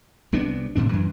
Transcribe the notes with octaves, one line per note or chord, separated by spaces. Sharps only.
C2 C3 B3 D4
F#1 A2 C3 D4
F#2 E3